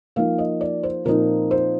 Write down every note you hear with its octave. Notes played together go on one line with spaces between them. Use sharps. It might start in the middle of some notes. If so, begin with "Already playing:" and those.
F3 A#3 D#4 F5
D#5
D5
C5
A#2 F3 C4 D#4 A#4
C5